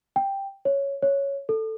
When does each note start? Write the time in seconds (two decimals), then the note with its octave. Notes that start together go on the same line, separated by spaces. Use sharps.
0.16 G5
0.65 C#5
1.02 C#5
1.49 A4